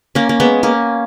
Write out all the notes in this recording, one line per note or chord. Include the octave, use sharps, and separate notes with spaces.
A#3 C#4
A#3
G#3 B3
A#3 C#4